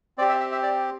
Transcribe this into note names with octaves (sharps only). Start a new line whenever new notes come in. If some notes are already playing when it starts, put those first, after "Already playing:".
C4 G4 D5
E5
E5
E5
D5